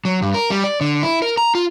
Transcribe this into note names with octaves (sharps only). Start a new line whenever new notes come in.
F#3
G2
A#4
G3
D5
D3
E4
A#4
A#5
F4